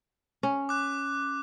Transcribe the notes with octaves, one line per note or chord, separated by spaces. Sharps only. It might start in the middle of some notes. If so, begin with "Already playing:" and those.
C#4
D6 F#6